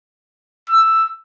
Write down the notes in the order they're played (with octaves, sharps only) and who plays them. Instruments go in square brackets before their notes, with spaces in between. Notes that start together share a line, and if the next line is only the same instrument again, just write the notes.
[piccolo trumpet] E6